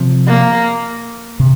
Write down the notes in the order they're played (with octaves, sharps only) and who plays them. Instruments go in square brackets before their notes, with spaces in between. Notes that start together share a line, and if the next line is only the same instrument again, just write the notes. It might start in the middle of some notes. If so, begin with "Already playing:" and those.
Already playing: [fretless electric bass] C3 F3 C4
[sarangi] A#3
[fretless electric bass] C3